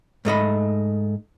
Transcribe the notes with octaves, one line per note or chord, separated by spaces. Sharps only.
G#2 A3 D#5 B5